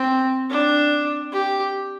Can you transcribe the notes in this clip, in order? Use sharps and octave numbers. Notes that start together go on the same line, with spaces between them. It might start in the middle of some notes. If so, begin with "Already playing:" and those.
Already playing: C4
D4
G4